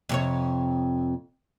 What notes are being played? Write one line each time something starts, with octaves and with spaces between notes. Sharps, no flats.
F2 C3 C#5